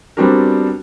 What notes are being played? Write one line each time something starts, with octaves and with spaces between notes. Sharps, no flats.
G3 B3 C4 D4 F#4 A#4